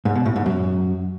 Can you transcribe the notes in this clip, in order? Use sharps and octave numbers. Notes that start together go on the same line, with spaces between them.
G#2
B2
A2
G#2
F#2